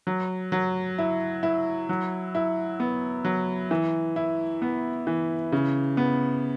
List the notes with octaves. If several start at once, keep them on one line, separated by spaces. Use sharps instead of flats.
F#3
F#3
E4
E4
F#3
E4
B3
F#3
E3
E4
B3
E3
C#3
B3